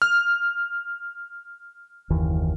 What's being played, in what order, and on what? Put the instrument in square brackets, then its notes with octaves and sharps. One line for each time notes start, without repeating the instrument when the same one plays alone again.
[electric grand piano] F6
[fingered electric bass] F#1 D#2 E3